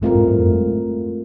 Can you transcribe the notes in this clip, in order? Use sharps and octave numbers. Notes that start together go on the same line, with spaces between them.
G#2 G#3 A3 C4 F4 A#4
G#2 G#3
G2 G3
F#2 F#3
G#3